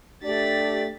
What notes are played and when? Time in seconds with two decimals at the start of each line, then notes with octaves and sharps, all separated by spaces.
0.23 A3 D4 G4 D5 A6 B6